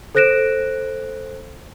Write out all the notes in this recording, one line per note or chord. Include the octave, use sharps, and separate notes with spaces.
A4 C5 F#6 A#6 D7 E7